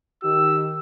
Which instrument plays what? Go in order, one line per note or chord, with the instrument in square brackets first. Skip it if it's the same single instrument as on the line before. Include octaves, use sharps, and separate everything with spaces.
[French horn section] D#3 G4 [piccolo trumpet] E6